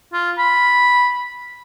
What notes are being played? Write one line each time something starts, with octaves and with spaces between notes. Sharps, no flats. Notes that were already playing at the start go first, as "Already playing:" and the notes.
F4
B5